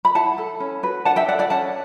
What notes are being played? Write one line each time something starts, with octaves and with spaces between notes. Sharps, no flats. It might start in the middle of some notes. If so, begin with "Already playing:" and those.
B5
E4 F#5 A5
A4
C#4
F#4 B4
D4 F#5 A5
E5 G5
A4 D5 F#5
D5 F#5
C#4 F#5 A5